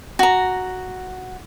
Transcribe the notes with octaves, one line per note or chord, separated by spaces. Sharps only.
F#4 A#5